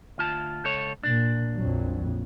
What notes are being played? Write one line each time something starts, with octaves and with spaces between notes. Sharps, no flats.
D2 F4 A5
C#2 A4 C#5
A#2 D4
A#1 F2 F#3